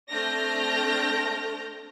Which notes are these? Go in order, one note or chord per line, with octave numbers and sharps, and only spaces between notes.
A3 C4 D4 F6 G6 A#6